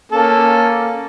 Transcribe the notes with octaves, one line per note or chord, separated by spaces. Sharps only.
A#3 C#4 A4